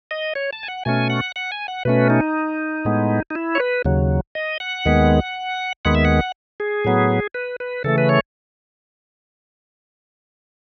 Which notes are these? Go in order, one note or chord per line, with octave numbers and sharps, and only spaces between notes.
D#5
C#5
A5
G#5
F#5
B2 A3 C#4 G#5
F#5
F#5
G#5
F#5
B2 A3 C#4 B4
D#4
A2 G#3 B3
D#4
E4
C#5
B4
D#2 C#3 F#3
D#5
F#5
D#2 D#3 G#3 B3
D#2 D#3 G#3 B3 F#5
E5
F#5
G#4
A2 F#3 B3
B4
B4
C#3 E3 A3 A4
B4
C#5